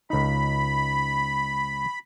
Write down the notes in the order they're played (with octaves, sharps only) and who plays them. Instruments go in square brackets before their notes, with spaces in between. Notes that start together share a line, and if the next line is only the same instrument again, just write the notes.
[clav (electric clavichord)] C#2 D#4 [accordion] B5